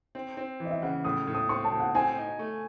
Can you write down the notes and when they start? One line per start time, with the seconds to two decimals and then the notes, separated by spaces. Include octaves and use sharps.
0.15 C4
0.37 C4
0.60 E3
0.65 D#5
0.71 E5
0.82 C#3 F#5
1.04 A2 D#6
1.27 A2
1.35 D#6
1.49 C4 C#6
1.64 A5
1.72 A2
1.80 F#5
1.95 C4 G#5
2.17 D#4
2.39 A3